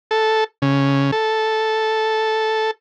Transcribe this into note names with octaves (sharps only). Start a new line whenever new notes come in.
A4
C#3
A4